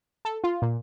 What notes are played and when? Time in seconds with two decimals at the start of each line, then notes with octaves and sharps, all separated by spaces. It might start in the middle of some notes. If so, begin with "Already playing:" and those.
0.25 A4
0.44 F4
0.62 A#2